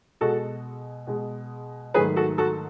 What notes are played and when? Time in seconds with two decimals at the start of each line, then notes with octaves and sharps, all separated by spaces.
0.21 B2 G#3 F#4 A4
1.07 B2 G#3
1.94 G#2 D#3 F#3 A3 G#4 B4
2.16 F#4 A4
2.38 F#4 A4